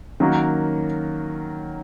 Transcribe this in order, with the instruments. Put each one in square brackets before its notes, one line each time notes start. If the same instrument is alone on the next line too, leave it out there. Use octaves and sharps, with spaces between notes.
[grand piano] D#3 F#3 A#3 C#4 F#4